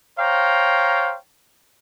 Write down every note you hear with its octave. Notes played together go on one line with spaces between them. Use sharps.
C5 C#5 F5 G5 A#5